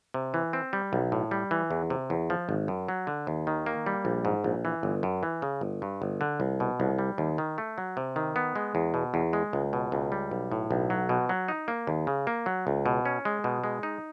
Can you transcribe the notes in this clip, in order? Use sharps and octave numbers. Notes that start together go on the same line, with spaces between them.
C3
E3
C4
G3
B1
A2
G3
E3
E2
C3
E2
F3
G#1
F#2
F#3
D3
D#2
D#3
A#3
G3
A#1
G#2
A#1
E3
G1
F#2
E3
C#3
G1
G2
G1
D3
C2
B2
C2
G3
D#2
D#3
A3
F#3
C3
D#3
B3
G#3
E2
B2
E2
G#3
C#2
B2
C#2
G3
B1
A2
B1
F#3
B2
F#3
D#4
A#3
D#2
C#3
A#3
F#3
C#2
B2
C#4
G#3
B2
G#3
D#4